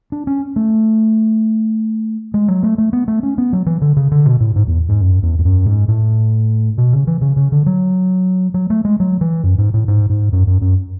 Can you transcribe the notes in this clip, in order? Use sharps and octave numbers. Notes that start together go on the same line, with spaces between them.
D4
C#4
A3
G#3
F#3
A3
A3
B3
A3
C#4
B3
F#3
E3
D3
C#3
D3
B2
A2
G#2
E2
G#2
F#2
E2
E2
F#2
G#2
A2
B2
C#3
E3
C#3
C#3
D3
F#3
F#3
A3
G#3
F#3
E3
F#2
G#2
A2
G#2
G#2
F#2
F#2
F#2